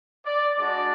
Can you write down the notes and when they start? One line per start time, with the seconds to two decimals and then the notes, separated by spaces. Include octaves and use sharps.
0.26 D5
0.58 G#3 D4 F#4 D5